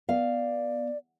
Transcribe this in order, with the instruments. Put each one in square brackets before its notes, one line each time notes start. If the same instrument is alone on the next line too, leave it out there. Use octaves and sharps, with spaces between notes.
[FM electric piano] B3 [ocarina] D5 [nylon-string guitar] F5